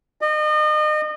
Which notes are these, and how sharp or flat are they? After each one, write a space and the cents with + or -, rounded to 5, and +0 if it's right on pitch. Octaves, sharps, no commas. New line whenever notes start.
D#5 -35